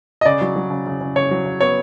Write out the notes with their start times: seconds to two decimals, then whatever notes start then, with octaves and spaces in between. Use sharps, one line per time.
0.21 D#5
0.25 C#3 D5
0.41 F#3
0.56 F#3
0.70 C#3
0.86 C#3
1.01 C#3
1.16 C#3 C#5
1.31 F#3
1.45 C#3
1.61 B3 C#5